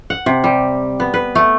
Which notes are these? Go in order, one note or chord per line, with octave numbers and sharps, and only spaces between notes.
F#5
C3
G3
B3
B4
A3